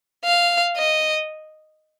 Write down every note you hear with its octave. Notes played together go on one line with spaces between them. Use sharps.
F5
D#5